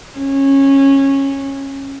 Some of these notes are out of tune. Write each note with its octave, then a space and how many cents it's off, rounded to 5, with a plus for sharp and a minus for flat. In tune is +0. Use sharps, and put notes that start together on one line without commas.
C#4 -15